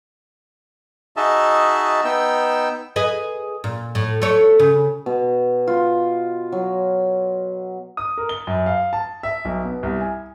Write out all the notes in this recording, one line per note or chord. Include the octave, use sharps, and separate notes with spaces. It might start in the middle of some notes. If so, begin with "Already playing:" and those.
D#4 F#4 G#4 D#5 E5 A5
B3 D#4 G5 E6
G#4 B4 D#5
A#2
A2
A3 C#5
C#3
B2
F4
F#3
D#6
A#4
G7
F#2
F5
A5
E5
B1
B2
C2
G#5